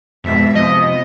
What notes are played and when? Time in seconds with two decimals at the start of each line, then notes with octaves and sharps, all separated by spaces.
0.24 F2 G#2 B2 E5
0.55 C3 F3 B3 D#5